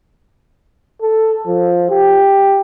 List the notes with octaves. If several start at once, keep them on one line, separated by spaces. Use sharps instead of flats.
A4
F3
G4